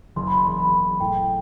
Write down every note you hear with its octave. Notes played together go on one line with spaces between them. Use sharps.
F#1 C6
B5
C6
E2
B5
F#1
A2 G5